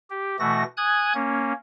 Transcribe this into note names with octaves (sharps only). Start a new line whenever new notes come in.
G4
B2 E3 A3 F#4 A#6
G#5 D#6 F#6 G#6
A#3 C#4